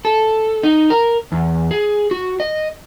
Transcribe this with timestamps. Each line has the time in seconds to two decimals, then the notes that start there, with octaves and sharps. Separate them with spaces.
0.05 A4
0.63 D#4
0.90 A#4
1.32 E2
1.71 G#4
2.11 F#4
2.40 D#5